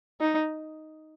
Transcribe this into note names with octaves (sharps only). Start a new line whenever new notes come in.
D#4